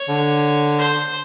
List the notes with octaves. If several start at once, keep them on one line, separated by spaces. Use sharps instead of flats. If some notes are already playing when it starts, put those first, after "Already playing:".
Already playing: C#5
D3
C5